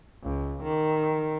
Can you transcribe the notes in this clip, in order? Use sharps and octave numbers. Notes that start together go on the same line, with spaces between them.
C#2
D#3